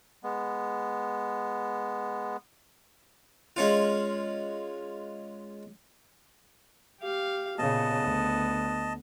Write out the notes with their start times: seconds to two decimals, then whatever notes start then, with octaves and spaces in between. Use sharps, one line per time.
0.24 G#3 B3
3.56 G#3 C#4 F4
7.01 G4 F5
7.58 A#2 C#3 B3 D#5 A5
8.02 D2